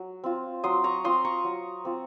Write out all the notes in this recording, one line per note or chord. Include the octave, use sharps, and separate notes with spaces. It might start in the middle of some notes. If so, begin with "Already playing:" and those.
Already playing: F#3
C4 F4
F#3 C6 D#6
A#5 C#6
C4 F4 C6 D#6
A#5 C#6
F#3
C4 F4